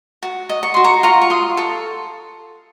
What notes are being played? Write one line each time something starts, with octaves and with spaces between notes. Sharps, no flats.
F#4
D#5
C#6
F#4 C6
A#5 C#6
F4 A#5 C#6
C#6
F4 C6 D#6
A4 C#6